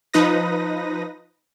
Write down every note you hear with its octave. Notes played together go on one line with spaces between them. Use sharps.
F3 D#4 B4 D#6 A#6